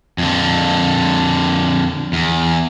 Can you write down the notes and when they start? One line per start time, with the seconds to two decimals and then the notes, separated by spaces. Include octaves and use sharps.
0.18 F2 D3
2.13 E2